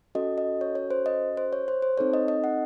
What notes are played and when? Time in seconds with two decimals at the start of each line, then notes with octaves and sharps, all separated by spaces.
0.15 C#4 F#4 A4 D#5
0.38 D#5
0.61 C#5
0.75 C#5
0.91 C5
1.06 D#5
1.37 C5
1.53 C#5
1.68 C5
1.82 C5
1.98 C4 D#4 A4 C#5
2.14 D#5
2.28 D#5
2.44 F#5